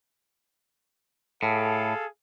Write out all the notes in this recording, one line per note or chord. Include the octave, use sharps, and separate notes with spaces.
A2 G#4 A4 F5